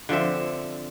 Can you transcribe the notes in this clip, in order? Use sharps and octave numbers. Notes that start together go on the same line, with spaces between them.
D3 F3 C4 E5